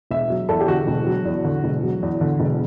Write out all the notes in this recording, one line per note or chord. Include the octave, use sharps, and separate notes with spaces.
E1 E5
F#3
E2 A4
G4
D3 F#4
E1
F#3
E2
D3
E1
F#3
E2
D3
E1